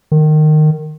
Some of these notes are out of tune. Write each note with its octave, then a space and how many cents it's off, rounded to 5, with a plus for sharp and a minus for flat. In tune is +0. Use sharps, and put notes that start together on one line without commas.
D#3 -20